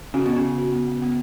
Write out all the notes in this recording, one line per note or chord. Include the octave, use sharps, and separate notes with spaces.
C#3 F#4
B2 B3
C#3
B3
F#4
B3
B3
B3